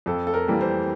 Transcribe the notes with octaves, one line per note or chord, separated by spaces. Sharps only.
F2 A4
A4
A#4
E3 G3 A#3
C5